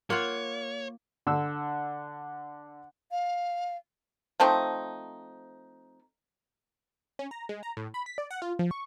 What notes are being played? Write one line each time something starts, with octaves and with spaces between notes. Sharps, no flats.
A#3 F4 C#5 F#5
D3 E6
F5
F3 A3 C4 D#4
C#4
A#5
G#3
A#5
A2
B5
B6
D5
F#5
F4
F3
C#6